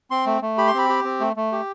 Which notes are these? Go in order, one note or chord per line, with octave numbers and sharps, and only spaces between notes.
C4 C6
A3
A3
G4 B5
C6
C4 B5
G4
C4
A3
A3
G4